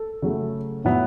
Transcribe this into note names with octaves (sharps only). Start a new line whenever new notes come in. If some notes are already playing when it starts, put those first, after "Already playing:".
Already playing: A4
C#3 F#3 A3
A2 F#3 B3